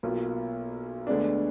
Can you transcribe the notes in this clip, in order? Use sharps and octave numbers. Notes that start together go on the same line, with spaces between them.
B1 B2 A#3 F4
D2 D3 G#3 B3 D4